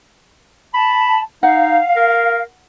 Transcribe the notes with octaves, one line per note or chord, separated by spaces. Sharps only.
A5 B5
D#4 F5 F#5
A#4